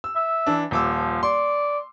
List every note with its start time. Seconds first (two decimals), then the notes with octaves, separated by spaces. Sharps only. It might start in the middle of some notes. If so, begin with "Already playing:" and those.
0.04 E6
0.16 E5
0.47 E3 D4
0.71 D#1 F3 D6 E6
1.23 D5 C6